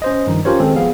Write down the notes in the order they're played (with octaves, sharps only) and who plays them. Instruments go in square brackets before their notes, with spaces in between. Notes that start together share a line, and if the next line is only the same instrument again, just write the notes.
[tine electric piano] C#4 C5 D#5
G2 D#3 F3 D#4
C#4 F4 G4 A#4 C5 C#5
D#3 G#3 C4 A4
F3 B3 G#4 F5